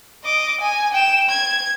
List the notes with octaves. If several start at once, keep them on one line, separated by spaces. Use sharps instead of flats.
D#5 D6
G#5
G5 E7
G#6